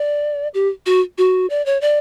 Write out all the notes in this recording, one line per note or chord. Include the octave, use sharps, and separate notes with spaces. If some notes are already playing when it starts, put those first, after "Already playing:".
Already playing: D5
G4
F#4
F#4
D5
C#5
D5